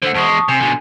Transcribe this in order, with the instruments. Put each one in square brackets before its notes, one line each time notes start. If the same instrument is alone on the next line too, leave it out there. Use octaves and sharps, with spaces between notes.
[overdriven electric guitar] D3 A3 [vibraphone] C5 F#5
[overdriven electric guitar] E2 G#3 [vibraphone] A5 C#6 D#6
[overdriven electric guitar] C3 [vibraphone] G#5 C6
[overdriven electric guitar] B2 D3